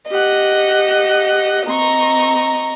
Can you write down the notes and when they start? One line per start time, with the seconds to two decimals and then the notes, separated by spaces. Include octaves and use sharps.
0.11 G4 D#5 F#5
1.67 C4 D#5 A#5 C#6